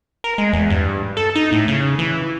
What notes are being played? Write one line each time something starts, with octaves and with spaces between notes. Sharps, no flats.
A#4
G#3
E2
G2
A4
D#4
A2
C#3
E3